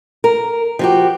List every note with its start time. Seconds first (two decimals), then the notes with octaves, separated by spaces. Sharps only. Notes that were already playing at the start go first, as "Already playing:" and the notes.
0.24 A#4
0.79 F3 F#4 G4